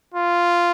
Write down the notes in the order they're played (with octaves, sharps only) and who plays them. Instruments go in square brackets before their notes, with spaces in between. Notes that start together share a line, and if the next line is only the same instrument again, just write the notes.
[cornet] F4